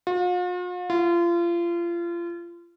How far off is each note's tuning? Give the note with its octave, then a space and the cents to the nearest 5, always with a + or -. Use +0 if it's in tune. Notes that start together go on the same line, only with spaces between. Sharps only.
F4 +45
F4 -30